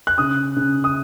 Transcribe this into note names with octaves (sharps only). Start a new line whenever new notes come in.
F#6
C#3 D#6
C#3
D#6